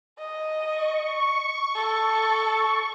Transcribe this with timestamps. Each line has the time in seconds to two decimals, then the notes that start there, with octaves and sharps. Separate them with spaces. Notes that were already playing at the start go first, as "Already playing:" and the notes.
0.19 D#5
0.69 C#6
1.75 A4